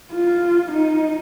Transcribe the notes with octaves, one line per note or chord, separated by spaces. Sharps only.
F4
D#4